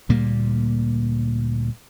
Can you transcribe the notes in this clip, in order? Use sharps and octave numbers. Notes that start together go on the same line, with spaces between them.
D2 A#2 G3 A#3